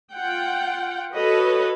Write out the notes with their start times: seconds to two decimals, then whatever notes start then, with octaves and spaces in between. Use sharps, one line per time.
0.12 F4 F#5 G5
1.14 F#4 A4 B4 C#5 D#5